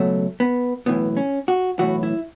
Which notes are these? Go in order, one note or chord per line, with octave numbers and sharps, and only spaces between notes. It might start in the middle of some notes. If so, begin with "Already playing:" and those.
Already playing: C#2 B2 F#3 A3
B3
B1 A2 E3 B3
C#4
F#4
B1 A2 E3 F#4
E4